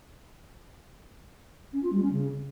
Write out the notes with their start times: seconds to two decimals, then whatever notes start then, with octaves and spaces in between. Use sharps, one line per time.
1.73 C#4
1.83 F4
1.92 G3
2.02 C#4
2.12 C#3